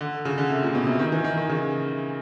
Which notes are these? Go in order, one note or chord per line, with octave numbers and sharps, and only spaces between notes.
D3
C#3
D3
C3
A#2
B2
C3
D#3
E3
D#3
D#3
C#3